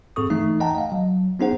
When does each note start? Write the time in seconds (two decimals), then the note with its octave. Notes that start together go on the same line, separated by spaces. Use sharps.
0.16 G#2 C4 G#4 A4 C#6 D#6
0.30 E3 A3 D#4
0.60 D#5 F#5 G5 A5 A#5
0.75 D#5 F5
0.92 F#3
1.39 B3 C#4 D#4 G#4 C5 F#5